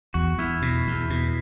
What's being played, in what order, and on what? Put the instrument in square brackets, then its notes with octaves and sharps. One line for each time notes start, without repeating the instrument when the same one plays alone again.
[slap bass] E2 [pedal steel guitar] F#4
[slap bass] E2 [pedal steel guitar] E4
[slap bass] B2
E2
B2